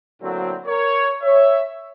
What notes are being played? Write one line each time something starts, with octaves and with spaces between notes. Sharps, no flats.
A2 D3 F#3 A#3 C4
A#4 C#5
C#5 E5